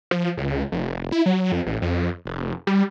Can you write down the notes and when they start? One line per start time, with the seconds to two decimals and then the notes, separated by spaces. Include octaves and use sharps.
0.11 F3
0.37 C#2
0.72 F1
1.12 E4
1.26 F#3
1.52 F2
1.66 A1
1.82 F2
2.26 F1
2.67 G3